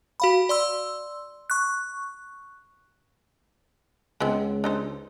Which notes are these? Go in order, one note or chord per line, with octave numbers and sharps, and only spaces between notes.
F#4 F5 B5
D5 C6 E6
C#6 F#6
C#2 G#3 B3 C4
D4 D#4 C5